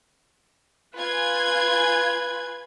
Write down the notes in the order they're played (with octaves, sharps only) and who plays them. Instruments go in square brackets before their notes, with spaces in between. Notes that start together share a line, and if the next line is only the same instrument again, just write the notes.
[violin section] F4 G#5 G#6 [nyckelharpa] B4